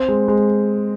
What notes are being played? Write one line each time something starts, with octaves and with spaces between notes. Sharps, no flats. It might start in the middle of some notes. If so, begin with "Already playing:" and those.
Already playing: C4
G#3
G#3